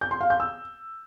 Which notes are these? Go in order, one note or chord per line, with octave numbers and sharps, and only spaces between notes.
G6
C6
F5
G6
E6